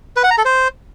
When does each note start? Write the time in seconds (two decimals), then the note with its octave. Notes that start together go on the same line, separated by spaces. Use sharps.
0.16 B4
0.24 F#5
0.31 A#5
0.38 A4
0.45 C5